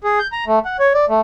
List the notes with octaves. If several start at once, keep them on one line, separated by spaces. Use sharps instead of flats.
G#4
G6
A#5
A3
F#5
C#5
D5
A3